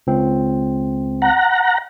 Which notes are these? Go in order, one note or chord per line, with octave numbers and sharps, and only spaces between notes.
C#2 C4
F#5 A#5